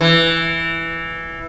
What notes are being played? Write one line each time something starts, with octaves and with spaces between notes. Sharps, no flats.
E3